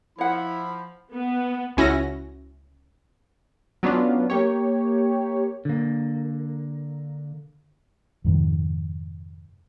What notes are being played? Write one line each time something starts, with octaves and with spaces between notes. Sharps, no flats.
F3 E4 C#5 F#5 B5
B3
C#2 C#4 E4 F#4 A#6
F#3 B3 C#4 D4 F4
A#3 G4 C#5
D3 A#3
F2 G#2 C3 D#3